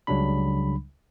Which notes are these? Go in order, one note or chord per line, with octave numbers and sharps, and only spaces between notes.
C#2 C#3 F#3 G3 D4 B5